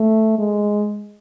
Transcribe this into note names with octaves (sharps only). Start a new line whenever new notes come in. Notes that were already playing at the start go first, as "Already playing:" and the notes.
Already playing: A3
G#3